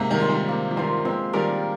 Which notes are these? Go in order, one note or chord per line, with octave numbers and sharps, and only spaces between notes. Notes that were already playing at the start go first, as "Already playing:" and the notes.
Already playing: G#2 C3 A#3
D#3 G3
F4 C5
D#3 G3
A#3
F3
D#3 G3 F4 C5
F3 G#3 C4
D#3 G3 G4 A#4 D5